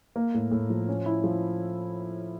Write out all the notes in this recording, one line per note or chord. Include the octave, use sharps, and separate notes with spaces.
A#3
A2
A2
F3
C#4
E4
F3